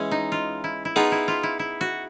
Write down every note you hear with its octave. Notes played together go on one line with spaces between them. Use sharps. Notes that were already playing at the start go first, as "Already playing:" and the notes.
Already playing: E3 G#3 C#4
D#4
F4
E4
E4
B3 D#4 F4 G#4
E4
F4
E4
E4
F#4